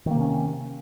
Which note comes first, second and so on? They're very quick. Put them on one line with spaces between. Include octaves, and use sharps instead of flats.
D#3 A#3 C3 C#4